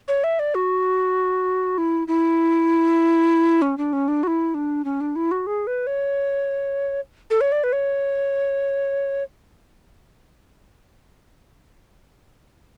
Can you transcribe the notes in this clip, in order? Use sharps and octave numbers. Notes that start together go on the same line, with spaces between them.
C#5
E5
D5
F#4
E4
E4
C#4
D4
C#4
D4
F#4
E4
D4
C#4
D4
E4
F#4
G#4
B4
C#5
A4
C#5
D5
B4
C#5